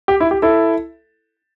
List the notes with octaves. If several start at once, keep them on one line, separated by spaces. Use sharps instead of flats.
G4
E4
G4
E4 A4